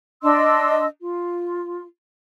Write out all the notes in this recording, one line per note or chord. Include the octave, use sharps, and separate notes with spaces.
D4 D#5 C6 E6
F4